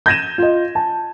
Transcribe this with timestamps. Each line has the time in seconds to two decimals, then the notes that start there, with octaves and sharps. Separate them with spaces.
0.06 G6 G#6 A#6 D#7 E7
0.38 F4 D#5
0.75 A5